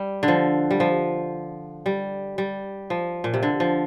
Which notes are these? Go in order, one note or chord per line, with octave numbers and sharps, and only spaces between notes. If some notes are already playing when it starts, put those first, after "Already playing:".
Already playing: G3
D3
F3
G3
F3
G3
G3
F3
A#2
C3
D3
F3